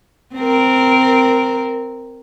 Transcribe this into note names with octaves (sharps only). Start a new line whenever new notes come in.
C4 A#4